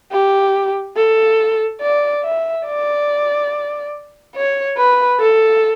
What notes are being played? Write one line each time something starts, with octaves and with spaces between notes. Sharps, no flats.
G4
A4
D5
E5
D5
C#5
B4
A4